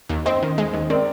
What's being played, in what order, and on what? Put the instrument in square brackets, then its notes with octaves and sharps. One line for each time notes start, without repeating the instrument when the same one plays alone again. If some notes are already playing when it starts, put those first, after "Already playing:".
[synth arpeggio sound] D#2
[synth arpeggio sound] C4 [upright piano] C5 D#5
[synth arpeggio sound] D#3
G#3
D#2
[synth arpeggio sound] C4 [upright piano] A#4 D5